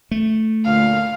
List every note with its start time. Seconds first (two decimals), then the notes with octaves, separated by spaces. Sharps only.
0.11 A3
0.65 D2 A#2 F5